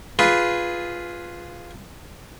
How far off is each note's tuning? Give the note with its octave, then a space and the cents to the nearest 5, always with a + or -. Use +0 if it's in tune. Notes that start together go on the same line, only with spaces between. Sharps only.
F4 +0 G#4 +0 B4 +0